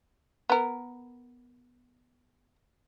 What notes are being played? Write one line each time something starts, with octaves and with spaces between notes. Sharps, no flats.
B3 A#4